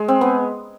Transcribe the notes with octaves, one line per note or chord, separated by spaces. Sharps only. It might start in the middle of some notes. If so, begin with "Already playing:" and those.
Already playing: G#3
C4
B3